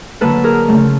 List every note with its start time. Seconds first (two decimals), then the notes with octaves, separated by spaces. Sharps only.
0.21 D3 F#3 A#3 D4 A4 B4
0.44 G#4 A#4
0.66 C#3 F3 A3 C#4